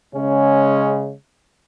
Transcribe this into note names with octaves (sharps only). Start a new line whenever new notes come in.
C#3 G#3 C#4